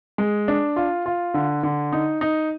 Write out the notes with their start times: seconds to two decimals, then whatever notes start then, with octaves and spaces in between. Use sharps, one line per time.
0.18 G#3
0.48 D4
0.76 F4
1.06 F4
1.34 D3
1.63 D3
1.92 D#4
2.21 D#4